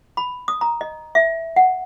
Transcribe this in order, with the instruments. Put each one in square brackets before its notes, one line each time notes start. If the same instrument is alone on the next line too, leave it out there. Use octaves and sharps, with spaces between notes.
[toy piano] B5
D#6
A#5
D#5
E5
F#5